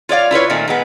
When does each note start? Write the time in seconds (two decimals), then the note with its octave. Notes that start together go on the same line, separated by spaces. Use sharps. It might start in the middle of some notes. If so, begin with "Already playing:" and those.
0.09 F4 C#5 D5 F5
0.31 E4 F4 B4 C#5
0.50 A#2 D#3 A3 C4
0.68 A#2 G#3 B3